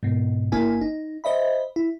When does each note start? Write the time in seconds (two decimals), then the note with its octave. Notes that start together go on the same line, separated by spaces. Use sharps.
0.03 G#2 B2
0.52 G1 A#3 E4 G#5
0.81 D#4
1.24 C5 D#5 E5 B5
1.76 E4